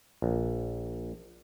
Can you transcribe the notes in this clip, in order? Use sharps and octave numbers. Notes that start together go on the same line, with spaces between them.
A#1